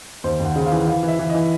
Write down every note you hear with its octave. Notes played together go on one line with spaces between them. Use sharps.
D#2 C5
D#2
F#5
C#3
F5
E3
E3 F5
E3
E5
E3
E3 D#5